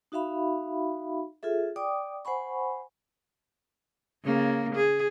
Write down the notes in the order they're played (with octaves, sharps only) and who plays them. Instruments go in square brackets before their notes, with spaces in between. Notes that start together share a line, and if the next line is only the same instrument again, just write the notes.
[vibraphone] D#4 F#4 E5 F5 B5
F4 G#4 A4 E5
D5 G5 D6 D#6
C5 F#5 G#5 B5 C#6
[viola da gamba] C#3 A#3
G#4